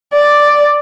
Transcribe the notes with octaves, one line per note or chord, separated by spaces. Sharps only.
D5